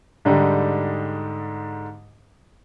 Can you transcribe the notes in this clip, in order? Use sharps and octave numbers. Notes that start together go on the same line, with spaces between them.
G#2 D3 G3 D#4 G4